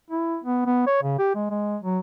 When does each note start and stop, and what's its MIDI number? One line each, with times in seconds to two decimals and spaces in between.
0.10 0.37 64
0.44 0.64 59
0.66 0.85 59
0.87 1.02 73
1.03 1.17 49
1.19 1.33 67
1.35 1.47 56
1.50 1.77 56
1.83 1.99 54